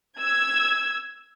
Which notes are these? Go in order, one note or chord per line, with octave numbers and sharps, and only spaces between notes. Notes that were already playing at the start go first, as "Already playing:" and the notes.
E6 G#6